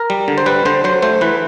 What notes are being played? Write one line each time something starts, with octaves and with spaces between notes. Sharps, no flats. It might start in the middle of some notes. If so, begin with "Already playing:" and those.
Already playing: A#4
G3
D3
C5
G3 B4
D3 C5
F#3 C5
A3 C5
E3 B4